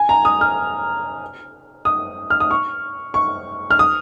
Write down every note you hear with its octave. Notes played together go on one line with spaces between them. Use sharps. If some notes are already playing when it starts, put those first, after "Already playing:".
Already playing: G#5
A#5
D#6
F6
D#6
F6
D#6
C#6
C#6
F6
D#6